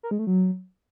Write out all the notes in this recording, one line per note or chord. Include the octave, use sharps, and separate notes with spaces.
A#4
G#3
A3
F#3